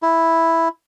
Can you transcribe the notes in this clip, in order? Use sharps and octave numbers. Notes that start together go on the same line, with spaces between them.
E4